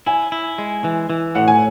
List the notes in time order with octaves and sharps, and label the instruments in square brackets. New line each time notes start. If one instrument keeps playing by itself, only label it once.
[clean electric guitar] E4 [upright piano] G#5
[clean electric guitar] E4
G#3
E3
E3
[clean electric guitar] A2 [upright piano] F#5
[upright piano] G#5